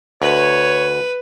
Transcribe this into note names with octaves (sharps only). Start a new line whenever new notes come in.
D2 B4 C#5